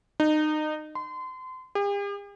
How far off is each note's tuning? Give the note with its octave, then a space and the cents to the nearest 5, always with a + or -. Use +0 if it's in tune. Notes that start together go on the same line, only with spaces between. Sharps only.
D#4 -25
C6 -30
G4 +45